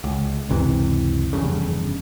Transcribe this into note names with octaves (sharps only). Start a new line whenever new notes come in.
C#2
F#1 C#2 C3 E3
F1 E2 G2 C#3